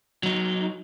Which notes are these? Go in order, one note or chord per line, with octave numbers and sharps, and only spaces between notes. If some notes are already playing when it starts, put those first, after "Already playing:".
F#3 D#4